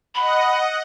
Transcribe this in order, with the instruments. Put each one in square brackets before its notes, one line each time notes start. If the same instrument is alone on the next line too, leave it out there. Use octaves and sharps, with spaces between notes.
[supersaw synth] D#5 F#5 [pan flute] B5